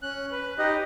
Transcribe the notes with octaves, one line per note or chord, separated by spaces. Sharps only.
C#4 F#6
B4
D#4 G4 D#5